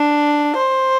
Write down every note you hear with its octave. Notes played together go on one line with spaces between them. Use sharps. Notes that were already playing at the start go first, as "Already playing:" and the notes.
Already playing: D4
C5